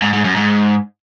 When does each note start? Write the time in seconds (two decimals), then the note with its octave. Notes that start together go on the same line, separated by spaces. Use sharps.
0.02 G#2
0.13 G#2
0.25 F#2
0.36 G#2